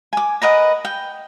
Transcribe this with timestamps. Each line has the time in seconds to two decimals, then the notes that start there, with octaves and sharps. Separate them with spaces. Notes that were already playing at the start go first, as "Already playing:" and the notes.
0.13 G#5 D6
0.42 A#4 B4 D#5 F#5
0.85 G5